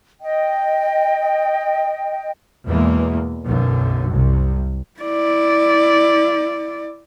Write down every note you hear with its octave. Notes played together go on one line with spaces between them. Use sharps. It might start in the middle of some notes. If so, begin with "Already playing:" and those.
D#5 G5
E2 B2 E3 G#3 A#3
B1 F#2 D3
C2 C3
E4 D5